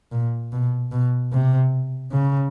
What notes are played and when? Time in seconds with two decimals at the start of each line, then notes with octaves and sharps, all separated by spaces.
0.12 A#2
0.52 B2
0.92 B2
1.32 C3
2.12 C#3